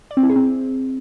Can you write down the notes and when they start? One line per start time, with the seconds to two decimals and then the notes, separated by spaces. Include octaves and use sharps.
0.11 D5
0.17 C4
0.23 E4
0.29 G#4
0.36 C4